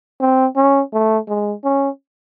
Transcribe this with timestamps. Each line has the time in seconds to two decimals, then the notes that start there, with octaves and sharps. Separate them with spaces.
0.21 C4
0.56 C#4
0.93 A3
1.28 G#3
1.64 C#4